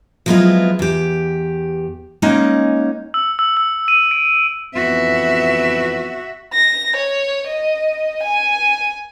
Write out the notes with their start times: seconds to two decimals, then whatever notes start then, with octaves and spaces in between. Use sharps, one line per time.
0.26 F3 F#3 G#3 B3 E4 F4
0.79 E2 G4
2.22 G#3 A#3 C#4 D#4 F#5
3.14 E6
3.39 E6
3.57 E6
3.88 D#7
4.11 D7
4.74 F2 E3 B3 F#4 E5
6.54 A#6
6.97 C#5
7.47 D#5
8.23 G#5